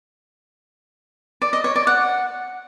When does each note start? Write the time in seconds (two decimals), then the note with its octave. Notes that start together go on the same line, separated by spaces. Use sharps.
1.42 D5
1.53 D#5
1.64 C#5
1.76 D5
1.87 F#5